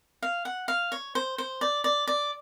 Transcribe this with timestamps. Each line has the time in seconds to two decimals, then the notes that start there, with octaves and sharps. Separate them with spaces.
0.23 F5
0.45 F#5
0.68 F5
0.92 C#5
1.15 C5
1.38 C5
1.61 D5
1.84 D5
2.07 D5